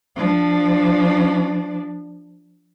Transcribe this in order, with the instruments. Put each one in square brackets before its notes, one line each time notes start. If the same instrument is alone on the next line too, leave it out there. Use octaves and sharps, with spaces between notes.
[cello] F3 D4